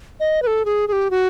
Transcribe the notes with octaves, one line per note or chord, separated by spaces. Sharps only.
D#5
B4
A4
G#4
G#4
G4
F#4